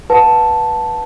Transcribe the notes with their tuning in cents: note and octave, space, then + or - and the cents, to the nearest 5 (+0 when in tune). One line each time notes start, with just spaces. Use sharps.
B4 -10 F#5 -30 A5 +0